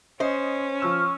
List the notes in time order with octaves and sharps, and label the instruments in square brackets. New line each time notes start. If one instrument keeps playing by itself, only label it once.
[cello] C#4 [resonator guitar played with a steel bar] C5 [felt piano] D#5
[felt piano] F3 E6 E7 [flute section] C#6 F6